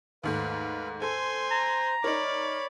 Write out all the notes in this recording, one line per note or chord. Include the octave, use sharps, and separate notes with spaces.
D#2 G#2 A3 B4 F5
A4 C5 G#5 C6
A#5
D#4 A#4 C#5 D5 B5